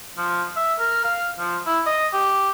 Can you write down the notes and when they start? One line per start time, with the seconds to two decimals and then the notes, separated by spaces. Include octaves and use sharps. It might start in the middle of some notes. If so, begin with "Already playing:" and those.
0.17 F3
0.56 E5
0.79 A#4
1.04 F5
1.39 F3
1.67 E4
1.86 D#5
2.13 G4